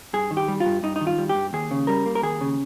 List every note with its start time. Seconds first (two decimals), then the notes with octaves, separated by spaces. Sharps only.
0.13 G2 G#4
0.31 D#3
0.37 G4
0.48 G3
0.60 F4
0.66 G2
0.83 G2 D#4
0.96 D#4
1.01 D#3
1.07 F4
1.18 G3
1.29 G4
1.35 G2
1.53 D#2 G#4
1.71 C#3
1.87 G3 A#4
2.06 A#3
2.15 A#4
2.23 D#2 G#4
2.41 C#3